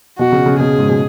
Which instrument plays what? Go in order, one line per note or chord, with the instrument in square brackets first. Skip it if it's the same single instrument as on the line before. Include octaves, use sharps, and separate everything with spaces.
[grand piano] B2 [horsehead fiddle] F#4
[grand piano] C#3
C#3
[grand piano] B2 [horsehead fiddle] G#4
[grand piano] G#2
B2